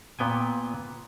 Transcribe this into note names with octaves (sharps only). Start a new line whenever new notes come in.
A#2 B3 G5 G#5